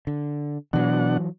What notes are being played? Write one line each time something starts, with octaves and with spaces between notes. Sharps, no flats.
D3
B2 E3 F#3 D4 F#5